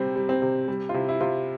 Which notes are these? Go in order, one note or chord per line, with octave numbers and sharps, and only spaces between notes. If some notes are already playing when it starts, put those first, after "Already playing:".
Already playing: C3 G3 C4
G3
C4
C3
G3
F4
C3 E4
E4
C3 F4